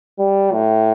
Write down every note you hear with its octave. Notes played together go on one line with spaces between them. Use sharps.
G3
A2